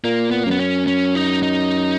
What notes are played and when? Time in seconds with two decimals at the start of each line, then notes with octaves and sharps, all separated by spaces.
0.04 A#2 A#3
0.31 B3
0.44 F#2 A#3
0.51 B3
0.59 C#4
0.87 C#4
1.15 D#4
1.43 D#4